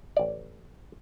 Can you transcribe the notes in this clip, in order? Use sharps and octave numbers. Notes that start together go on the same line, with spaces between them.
A1 D5